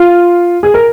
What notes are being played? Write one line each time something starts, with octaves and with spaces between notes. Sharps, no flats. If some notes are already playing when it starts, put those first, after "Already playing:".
Already playing: F4
G#4
A#4